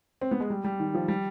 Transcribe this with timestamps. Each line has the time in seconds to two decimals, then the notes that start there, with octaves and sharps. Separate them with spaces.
0.21 C4
0.31 B3
0.40 G#3
0.50 G3
0.64 G3
0.80 D#3
0.94 F3
1.08 G3